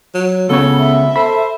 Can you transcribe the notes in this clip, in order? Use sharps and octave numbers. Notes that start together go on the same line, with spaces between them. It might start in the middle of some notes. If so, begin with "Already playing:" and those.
F#3
C#2 C#3 B3 A4 C#5
E5
A4 C5 B5